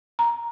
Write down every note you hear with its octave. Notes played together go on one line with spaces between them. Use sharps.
A#5